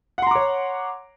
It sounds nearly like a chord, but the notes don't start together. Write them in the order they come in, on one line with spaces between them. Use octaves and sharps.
F#5 C6 A#5 D6 C#5